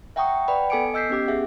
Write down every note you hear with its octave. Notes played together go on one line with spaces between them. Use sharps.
E5 F#5 G5 A#5 C#6 D#6
B4 D5 F#5 G5 B5
B3 A4 G#5 D6 C#7 D7
D#5 E6 G6 B6 C7
B3 C#4 G4 D6
G#4 E5 F#5